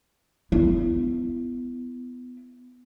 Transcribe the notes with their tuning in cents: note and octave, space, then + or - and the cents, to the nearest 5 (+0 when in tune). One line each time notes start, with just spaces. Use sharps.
B3 +20 E4 +30